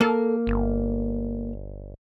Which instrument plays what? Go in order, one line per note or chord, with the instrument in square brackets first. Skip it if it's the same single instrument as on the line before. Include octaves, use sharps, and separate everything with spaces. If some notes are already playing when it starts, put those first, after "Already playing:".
[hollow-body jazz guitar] A#3 [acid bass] A4
[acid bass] G1